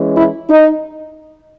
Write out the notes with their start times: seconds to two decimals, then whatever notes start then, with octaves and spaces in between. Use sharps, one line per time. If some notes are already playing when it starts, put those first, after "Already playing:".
Already playing: E3 G#3 C#4
0.15 E4
0.48 D#4